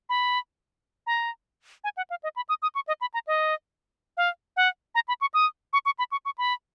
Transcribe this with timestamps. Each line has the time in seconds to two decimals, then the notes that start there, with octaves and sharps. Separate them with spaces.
0.09 B5
1.07 A#5
1.84 G#5
1.97 F#5
2.10 F5
2.23 D#5
2.36 B5
2.49 D#6
2.62 D#6
2.75 C#6
2.87 D#5
3.01 B5
3.14 A#5
3.27 D#5
4.17 F5
4.57 F#5
4.95 A#5
5.08 B5
5.21 C#6
5.34 D#6
5.73 C#6
5.86 C#6
5.99 B5
6.12 C#6
6.25 C#6
6.38 B5